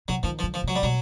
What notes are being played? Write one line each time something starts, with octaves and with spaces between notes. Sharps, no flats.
C3 F#3
D#3 F3
F3
D3
F3
C3 F#3
G3
B2 F#3